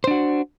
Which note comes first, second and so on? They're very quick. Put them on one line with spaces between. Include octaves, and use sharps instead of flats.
C5 D4 F#4